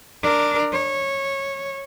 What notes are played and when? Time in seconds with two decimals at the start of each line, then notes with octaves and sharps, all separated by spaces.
0.22 D4 A#4
0.73 C#5